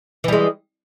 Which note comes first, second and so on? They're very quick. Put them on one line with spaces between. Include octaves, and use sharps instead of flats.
E3 G3 G#3